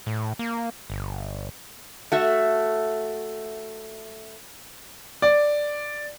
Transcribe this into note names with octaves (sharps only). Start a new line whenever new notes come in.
A2
A#3
G1
A3 F#4 E5
D5